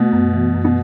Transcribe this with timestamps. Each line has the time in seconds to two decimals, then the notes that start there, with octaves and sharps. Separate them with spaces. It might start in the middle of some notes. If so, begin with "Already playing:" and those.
Already playing: B2 A3
0.13 F#2
0.34 E3
0.55 F#2
0.65 B2